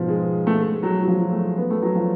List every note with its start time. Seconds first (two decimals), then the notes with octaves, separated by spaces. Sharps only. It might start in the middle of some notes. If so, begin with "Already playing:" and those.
Already playing: G#2 B2 F3
0.08 G#3
0.47 A3
0.59 G#3
0.83 F#3
1.03 F#3
1.07 F3
1.33 A3
1.58 B3
1.71 A3
1.82 F#3
1.95 F3